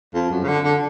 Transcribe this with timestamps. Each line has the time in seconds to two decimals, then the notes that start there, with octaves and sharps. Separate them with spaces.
0.15 F2
0.31 F#2
0.43 C#3
0.48 D3
0.64 D3